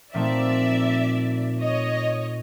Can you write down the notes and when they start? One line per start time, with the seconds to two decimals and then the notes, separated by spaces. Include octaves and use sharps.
0.14 A#2 F3 A3 C4 D#4 D5 E5
1.59 C#5 D#5